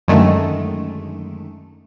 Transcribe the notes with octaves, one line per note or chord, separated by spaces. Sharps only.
F#2 D3 D#3 G#3 A3